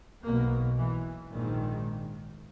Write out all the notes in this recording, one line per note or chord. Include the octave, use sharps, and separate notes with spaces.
B1 B2 A#3
E3
A#1 G#2 D#3